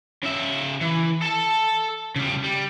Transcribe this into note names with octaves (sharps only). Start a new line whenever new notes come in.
C#3 E5
E3
A4 A5
C#3 G3
G3